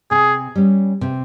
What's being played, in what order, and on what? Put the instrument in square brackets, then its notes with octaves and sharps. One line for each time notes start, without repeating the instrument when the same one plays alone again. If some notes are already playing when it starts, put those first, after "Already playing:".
[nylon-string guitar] C3 [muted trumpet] G#4
[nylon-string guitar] G3 C#4
C3